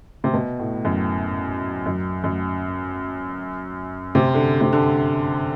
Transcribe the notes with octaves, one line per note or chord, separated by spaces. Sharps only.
C3
B2
A2
F#2
F#2
F#2
C3
D3
C3
D3